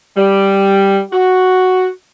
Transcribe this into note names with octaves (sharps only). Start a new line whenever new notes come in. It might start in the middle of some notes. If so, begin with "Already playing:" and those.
G3
F#4